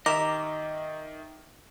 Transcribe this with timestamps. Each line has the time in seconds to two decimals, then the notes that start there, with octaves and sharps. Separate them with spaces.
0.06 D#3 G4 A#4 D#5 E5 D6